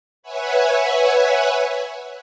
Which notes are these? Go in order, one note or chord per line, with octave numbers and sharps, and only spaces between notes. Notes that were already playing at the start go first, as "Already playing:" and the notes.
B4 C#5 E5 F#5 G#5